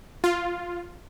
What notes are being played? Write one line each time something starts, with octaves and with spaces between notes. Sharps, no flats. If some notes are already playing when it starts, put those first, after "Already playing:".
F4